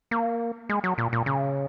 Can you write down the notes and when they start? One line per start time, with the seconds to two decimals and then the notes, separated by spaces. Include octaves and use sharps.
0.11 A#3
0.69 G#3
0.84 F#3
0.98 A#2
1.13 A#2
1.26 C#3